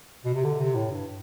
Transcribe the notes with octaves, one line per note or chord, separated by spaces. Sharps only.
B2
C3
D3
C3
A2
G2